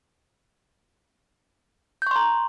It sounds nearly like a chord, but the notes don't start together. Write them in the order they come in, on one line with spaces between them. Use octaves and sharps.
G6 C#6 C6 A#5